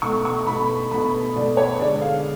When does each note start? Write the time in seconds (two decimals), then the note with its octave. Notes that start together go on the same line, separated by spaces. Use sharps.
0.02 B2 A3 C#6
0.25 C#6
0.47 B2 A3 B5
0.91 B2 A3 B5
1.36 B2 A3 D5
1.57 C#5
1.79 D3 G#3 D5
2.01 F5